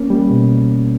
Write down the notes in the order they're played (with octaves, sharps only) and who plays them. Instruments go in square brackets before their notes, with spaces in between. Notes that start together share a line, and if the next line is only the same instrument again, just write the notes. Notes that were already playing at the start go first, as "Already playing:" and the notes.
Already playing: [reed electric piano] A#3 C#4
G3
B2